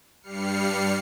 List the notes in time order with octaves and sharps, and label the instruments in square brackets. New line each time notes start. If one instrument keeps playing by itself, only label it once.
[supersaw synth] G2 G3 F6 C7 C#7